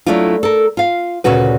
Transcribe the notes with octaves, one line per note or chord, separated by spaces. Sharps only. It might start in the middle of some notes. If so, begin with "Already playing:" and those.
F#3 G3 A3 D4 E4 F4
A4 A#4
F4 F5
D2 A#2 C#3 C#4 F#4 B4